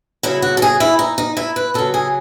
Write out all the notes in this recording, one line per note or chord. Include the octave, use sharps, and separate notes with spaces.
C#3 F#3 E4
F#4
A4
G#4
E4
D#4
D#4
E4
B4
C#3 F#3 A4
G#4